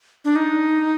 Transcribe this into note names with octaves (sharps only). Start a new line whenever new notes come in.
D4
D#4